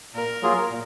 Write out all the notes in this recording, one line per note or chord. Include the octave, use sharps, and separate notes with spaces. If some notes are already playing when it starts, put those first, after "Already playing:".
A#2 A#4
F#3 A#3 F4 G#4
A#2